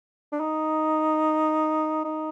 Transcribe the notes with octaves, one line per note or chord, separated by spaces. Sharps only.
D4
D#4
D#4